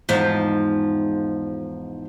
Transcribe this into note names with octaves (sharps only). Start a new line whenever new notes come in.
E2 G#2 F3